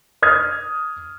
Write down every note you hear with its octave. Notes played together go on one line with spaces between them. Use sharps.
D#6 F6 G#6